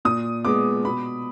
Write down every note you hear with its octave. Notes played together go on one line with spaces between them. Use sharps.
A#2 D#6
G#3 B3 D6
B2 B5